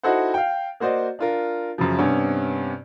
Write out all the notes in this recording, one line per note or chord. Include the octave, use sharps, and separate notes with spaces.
D#4 E4 F#4 A4 C5 F#5
F5 G5
A#3 F#4 C5 D5 D#5
D4 F4 A#4
F#2 C#3 F3
G2 C3 B3 C#4